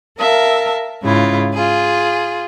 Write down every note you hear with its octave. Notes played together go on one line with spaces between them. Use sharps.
A#4 E5 F5 A5
G#2 C#3 E4 F4
F4 G#4